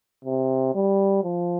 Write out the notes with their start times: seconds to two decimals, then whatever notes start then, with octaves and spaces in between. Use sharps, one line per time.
0.25 C3
0.75 G3
1.24 F3